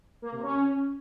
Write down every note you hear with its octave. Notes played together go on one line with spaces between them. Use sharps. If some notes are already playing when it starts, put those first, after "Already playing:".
A#3
C3
C#4